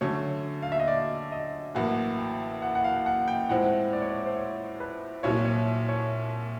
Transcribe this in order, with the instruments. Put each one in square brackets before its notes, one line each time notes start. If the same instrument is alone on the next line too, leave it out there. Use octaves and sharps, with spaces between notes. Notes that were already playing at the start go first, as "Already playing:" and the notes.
[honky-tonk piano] D3 F#3 A3 C#4 [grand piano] C#5
[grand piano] F5
E5
D#5
D5
D#5
[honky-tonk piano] A1 A2 F#3 A#3 [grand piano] F#5
[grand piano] G5
F#5
F#5
F5
F#5
G5
[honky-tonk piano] A2 F3 G#3 C4 E4 [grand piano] F#5
[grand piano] D5
C#5
D5
C5
C#5
B4
[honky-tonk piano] C2 A#2 F#3 [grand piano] C#5
[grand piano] C#5
C#5